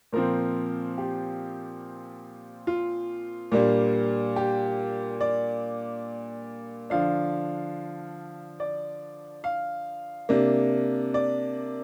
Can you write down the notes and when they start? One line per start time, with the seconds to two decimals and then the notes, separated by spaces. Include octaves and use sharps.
0.13 A#2 F3 C4 A#4
0.98 G4
2.67 F4
3.52 A#2 G3 A#3 D4
4.36 G4
5.21 D5
6.90 D3 F3 D4 F5
8.60 D5
9.44 F5
10.29 C3 A#3 D4
11.14 D5